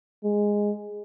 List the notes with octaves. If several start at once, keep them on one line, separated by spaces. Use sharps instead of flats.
G#3